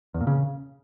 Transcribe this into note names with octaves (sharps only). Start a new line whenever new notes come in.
E2
A#2
C#3